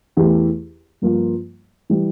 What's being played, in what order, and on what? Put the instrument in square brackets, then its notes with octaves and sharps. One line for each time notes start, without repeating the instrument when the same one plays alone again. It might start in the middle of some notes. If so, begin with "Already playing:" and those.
[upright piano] E2 E3 A3 E4 G4
G2 F3 A#3 F4
E3 G3